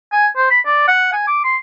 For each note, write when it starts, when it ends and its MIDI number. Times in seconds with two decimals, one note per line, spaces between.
0.12 0.27 80
0.36 0.48 72
0.51 0.60 83
0.66 0.88 74
0.88 1.09 78
1.13 1.23 80
1.27 1.40 86
1.44 1.56 84